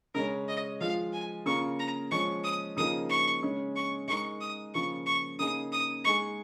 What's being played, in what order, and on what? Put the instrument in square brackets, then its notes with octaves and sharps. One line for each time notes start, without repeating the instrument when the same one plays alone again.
[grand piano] C#3 G#3 C#4 [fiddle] A#4
[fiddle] D#5
[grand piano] F3 G#3 F4 [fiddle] F5
[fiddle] G#5
[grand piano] C#3 A#3 F4 A#4 [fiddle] C#6
[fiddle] A#5
[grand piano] F3 G#3 C#4 [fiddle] C#6
[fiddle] D#6
[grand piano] C#3 F3 A#3 D#4 G#4 [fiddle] D#6
[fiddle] C#6
[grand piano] C#3 G#3 C#4
[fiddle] C#6
[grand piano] G#3 D#4 A#4 [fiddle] C#6
[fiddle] D#6
[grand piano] C#3 F3 A#3 F4 [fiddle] C#6
[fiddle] C#6
[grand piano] C#3 A#3 D#4 G#4 [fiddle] D#6
[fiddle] D#6
[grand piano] G#3 D#4 G#4 [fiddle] C#6